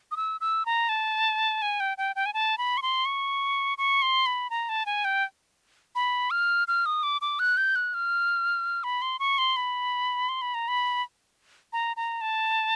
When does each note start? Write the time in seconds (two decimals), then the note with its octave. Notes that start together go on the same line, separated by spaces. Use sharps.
0.11 D#6
0.16 E6
0.41 E6
0.66 A#5
0.89 A5
1.62 G#5
1.80 G5
1.98 G5
2.16 G5
2.26 G#5
2.34 A5
2.58 B5
2.77 C#6
2.82 C6
3.05 C#6
3.78 C#6
4.02 C6
4.26 B5
4.50 A#5
4.69 A5
4.86 G#5
5.05 G5
5.95 B5
6.31 F6
6.68 F6
6.86 D#6
7.03 D6
7.21 D6
7.39 F#6
7.57 G6
7.76 F#6
7.94 F6
8.84 B5
9.02 C6
9.19 C#6
9.38 C6
9.56 B5
10.29 C6
10.42 B5
10.54 A#5
10.68 B5
11.73 A#5
11.97 A#5
12.21 A5